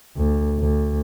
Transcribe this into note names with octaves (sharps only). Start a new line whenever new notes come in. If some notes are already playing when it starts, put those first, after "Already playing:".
D2
D2